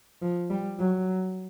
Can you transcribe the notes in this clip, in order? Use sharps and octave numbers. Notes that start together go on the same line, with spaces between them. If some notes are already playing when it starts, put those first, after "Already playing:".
F3
G3
F#3